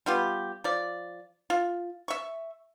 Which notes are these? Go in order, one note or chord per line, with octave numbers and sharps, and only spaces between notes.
G3 B3 F4 G4
F3 D5
F4
E5 C#6